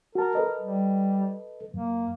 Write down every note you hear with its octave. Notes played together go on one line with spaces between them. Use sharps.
F#4 A#4 A5
A4 B4 D#5
G3
F#2 A#3